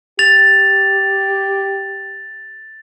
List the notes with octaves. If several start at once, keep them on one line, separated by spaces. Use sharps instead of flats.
G4 A6 F7